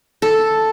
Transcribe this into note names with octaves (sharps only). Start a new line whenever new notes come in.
A4